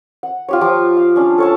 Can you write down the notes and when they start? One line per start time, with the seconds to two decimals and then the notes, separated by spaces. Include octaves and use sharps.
0.23 F#5
0.49 F4 G4 C#5
0.61 F3 G4 D6
0.97 F5
1.16 C#4 D4
1.38 A4 C#5 A5